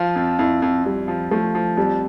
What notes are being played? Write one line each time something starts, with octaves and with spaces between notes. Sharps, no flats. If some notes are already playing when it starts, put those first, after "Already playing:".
Already playing: F3 F4
F2
F2 E4
F2
F2 G3
F3
F3 A3
F3
F2 G3